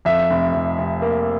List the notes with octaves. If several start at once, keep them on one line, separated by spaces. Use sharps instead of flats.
F2 E5
F1
F1
F1
A#3